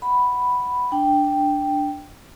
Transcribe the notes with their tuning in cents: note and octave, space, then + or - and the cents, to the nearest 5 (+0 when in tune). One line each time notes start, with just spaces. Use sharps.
F#5 +0 B5 +0
D4 +0 G5 +0